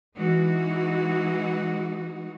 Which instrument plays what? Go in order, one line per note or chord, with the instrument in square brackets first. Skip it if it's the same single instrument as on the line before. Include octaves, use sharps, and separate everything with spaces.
[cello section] E3 G#3 D#4 F#4